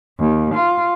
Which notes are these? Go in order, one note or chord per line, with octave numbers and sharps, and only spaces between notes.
D#2
F4